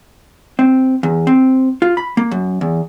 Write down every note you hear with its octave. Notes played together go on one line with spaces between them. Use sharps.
C4
E2
C4
F4
B5
A#3
F#2
E2